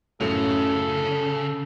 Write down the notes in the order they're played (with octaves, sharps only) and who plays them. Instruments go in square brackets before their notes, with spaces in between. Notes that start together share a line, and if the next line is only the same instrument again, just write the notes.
[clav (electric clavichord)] F#2 A2 F#3 [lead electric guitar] C#3 [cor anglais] A4